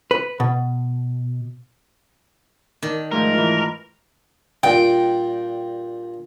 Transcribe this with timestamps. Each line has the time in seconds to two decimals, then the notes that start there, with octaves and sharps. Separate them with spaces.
0.11 B4
0.40 B2
2.82 D#3 D4
3.12 G#2 F3 A3 A#4
3.33 E3 F4
4.63 G2 A#2 G5